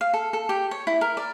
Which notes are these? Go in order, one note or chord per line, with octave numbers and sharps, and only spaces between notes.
F5
A4
A4
G4
C#5
E4
A#4
D5